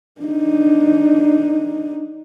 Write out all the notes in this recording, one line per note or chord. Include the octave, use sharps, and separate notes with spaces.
D4 D#4